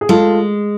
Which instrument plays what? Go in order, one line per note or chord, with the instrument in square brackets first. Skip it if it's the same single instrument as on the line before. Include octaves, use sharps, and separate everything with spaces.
[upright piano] G#4
[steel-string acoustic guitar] G#3 [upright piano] F4 A4